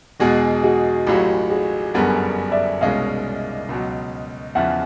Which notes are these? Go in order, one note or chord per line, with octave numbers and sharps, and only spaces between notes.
E2 B2 G#3 F#4 G#4
F#4 G#4
A1 A2 F#3 F4 G4
F#4 G#4
G1 F#2 D3 G3 B3 G#4 A#4
D5 E5
C2 B2 G#3 C#4 D#5 F5
C#2 B2 F#3
E2 C#3 F3 E5 F#5